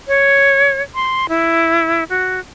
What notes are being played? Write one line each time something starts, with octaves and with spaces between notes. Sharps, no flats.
C#5
C6
E4
F#4